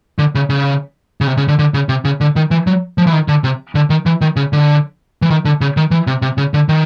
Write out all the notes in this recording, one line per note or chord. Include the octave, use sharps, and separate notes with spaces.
D3
C#3
C#3
C#3
C3
C#3
D3
D3
C#3
C3
C#3
D3
D#3
E3
F#3
F3
E3
D#3
D3
C3
D3
D#3
E3
D#3
C#3
D3
E3
D#3
D3
C#3
D#3
E3
C3
C3
C#3
D3
D#3